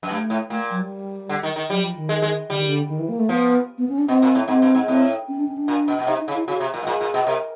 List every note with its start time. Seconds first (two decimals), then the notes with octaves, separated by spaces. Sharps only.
0.03 F#2
0.10 G2 A3
0.30 A2
0.50 A#2 A3
0.70 F#3
0.81 G3
1.29 D3
1.43 D#3
1.56 D#3
1.69 F#3 G3
1.83 F3
1.96 D#3
2.09 G#3
2.22 G#3
2.49 D3 G3
2.58 D#3
2.66 D3
2.89 D#3
2.99 E3
3.09 A#3
3.19 A3
3.29 F3 B3
3.78 B3
3.89 C#4
3.98 D4
4.08 B2 C4
4.22 A#2
4.35 A2
4.48 G#2 C4
4.62 G2
4.75 G#2
4.88 A2 C4
5.28 C#4
5.38 D4
5.48 C#4
5.58 D4
5.68 A#2
5.88 B2
5.99 B2
6.07 C3 D#4
6.21 D#4
6.28 C#3
6.34 E4
6.47 C#3 F#4
6.60 C3
6.74 A#2
6.83 B2
6.87 A#2 G#4
7.00 A#2
7.14 B2
7.26 C3 A#4